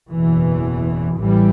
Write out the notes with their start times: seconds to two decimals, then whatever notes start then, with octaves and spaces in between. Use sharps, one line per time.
0.10 F#1 E2 B2 E3
1.20 A1 A2 E3 G3